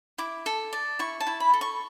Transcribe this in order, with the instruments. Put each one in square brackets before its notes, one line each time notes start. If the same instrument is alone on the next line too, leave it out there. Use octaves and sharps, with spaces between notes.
[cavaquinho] E4 D6
A4
D5
E4 C#6
A5
E4
B5
A4
C#6